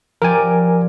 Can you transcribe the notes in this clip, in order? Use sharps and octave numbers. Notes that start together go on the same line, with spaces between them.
F3 G4 A#4 D5 G#5